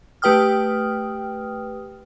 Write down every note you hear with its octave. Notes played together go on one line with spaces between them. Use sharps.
A3 G4 B4 G5 D#6 F6